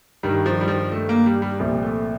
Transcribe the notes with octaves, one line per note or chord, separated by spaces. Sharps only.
G2 D#3 G3
F3
G3
F3
A3
A#3
G3
G3
C2 A#2 F3 G3
A3